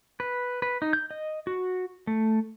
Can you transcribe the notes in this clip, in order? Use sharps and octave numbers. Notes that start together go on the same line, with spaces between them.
B4
B4
D#4
G6
D#5
F#4
A3